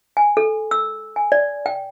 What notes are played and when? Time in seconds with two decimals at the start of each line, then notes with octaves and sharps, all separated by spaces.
0.17 G#5
0.37 A4
0.71 E6
1.16 G#5
1.32 D5
1.66 G5